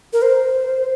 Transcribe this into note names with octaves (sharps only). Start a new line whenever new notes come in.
A#4
C5